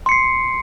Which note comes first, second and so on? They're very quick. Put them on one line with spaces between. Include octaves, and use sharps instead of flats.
C6 C#7 C7